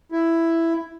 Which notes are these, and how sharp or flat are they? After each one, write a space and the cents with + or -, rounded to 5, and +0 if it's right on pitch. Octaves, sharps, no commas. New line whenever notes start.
E4 +5